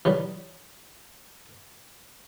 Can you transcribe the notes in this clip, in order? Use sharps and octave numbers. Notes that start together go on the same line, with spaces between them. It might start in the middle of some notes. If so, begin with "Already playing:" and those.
E3 F#3 G3